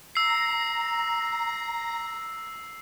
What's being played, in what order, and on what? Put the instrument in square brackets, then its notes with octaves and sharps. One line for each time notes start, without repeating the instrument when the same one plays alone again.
[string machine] A#5 [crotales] E6 C7